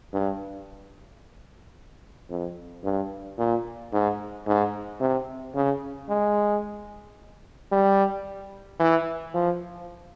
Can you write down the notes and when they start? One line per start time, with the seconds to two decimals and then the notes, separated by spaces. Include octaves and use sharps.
0.14 G2
2.30 F2
2.84 G2
3.38 A#2
3.93 G#2
4.47 G#2
5.01 C3
5.55 C#3
6.09 G#3
7.72 G3
8.80 E3
9.34 F3